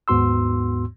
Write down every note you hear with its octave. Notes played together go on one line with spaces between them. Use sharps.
D#2 G#2 B3 F#4 C6 E6